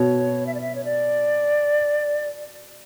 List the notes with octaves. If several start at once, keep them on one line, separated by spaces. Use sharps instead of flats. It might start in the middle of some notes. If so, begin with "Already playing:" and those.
Already playing: B2 C#5
E5
D5
E5
C#5
D5